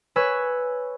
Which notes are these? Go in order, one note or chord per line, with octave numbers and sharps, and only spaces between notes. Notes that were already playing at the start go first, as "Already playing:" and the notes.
B4 C#5 G#5 C#6 E6 G#6